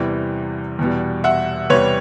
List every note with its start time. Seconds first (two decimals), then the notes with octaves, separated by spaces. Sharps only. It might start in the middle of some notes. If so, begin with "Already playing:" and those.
Already playing: E2 C3 E3 G3
0.79 E2 B2 G3
1.24 E5 F#5
1.70 E2 C3 E3 G3 B4 C#5